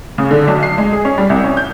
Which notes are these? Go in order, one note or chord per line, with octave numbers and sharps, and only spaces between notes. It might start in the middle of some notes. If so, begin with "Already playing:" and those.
C#3
D3
B1
C7
G#3
G#4
C#4
G3
C2
C#4
G6